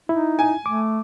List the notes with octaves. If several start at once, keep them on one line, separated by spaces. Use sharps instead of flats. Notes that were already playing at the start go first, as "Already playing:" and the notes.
D#4 E4
G#5
A3 D6